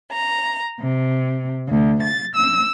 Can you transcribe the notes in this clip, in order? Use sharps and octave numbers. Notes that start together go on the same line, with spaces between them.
A#5
C3
D2
A6
E6